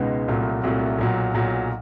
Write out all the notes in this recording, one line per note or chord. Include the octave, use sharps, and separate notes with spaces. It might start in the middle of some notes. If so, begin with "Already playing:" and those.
Already playing: C#2 B2 G#3 B3 D#4
C2 A#2 F#3 A3
C2 A#2 F#3 A3
B1 A#2 F#3
B1 A#2 F#3